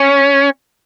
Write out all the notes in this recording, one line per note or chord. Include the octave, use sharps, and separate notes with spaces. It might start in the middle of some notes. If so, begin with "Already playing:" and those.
Already playing: C#4